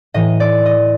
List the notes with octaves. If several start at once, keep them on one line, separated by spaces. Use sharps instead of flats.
A2 E3 D#5
D5
D#5